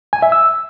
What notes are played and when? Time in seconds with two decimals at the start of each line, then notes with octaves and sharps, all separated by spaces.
0.13 G#5
0.22 E5
0.32 E6